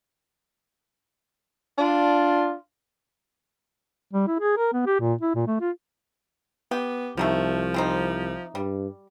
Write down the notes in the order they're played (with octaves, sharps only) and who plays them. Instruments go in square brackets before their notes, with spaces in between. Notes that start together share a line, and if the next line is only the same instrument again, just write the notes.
[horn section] D4 F4
[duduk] G3
E4
G#4
A#4
B3
G4
A#2
E4
A#2
A3
F4
[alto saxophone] B3 [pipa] G4
[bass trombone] C2 [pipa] B2 D#3 A3 [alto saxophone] F3
[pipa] E3 C4 D#4
[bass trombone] G2 [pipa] G3